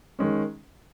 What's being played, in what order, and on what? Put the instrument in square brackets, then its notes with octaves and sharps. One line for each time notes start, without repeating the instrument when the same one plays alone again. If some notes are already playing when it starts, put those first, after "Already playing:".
[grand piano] D#3 G#3 C#4